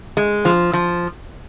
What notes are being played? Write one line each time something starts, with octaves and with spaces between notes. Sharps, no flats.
G#3
F3
F3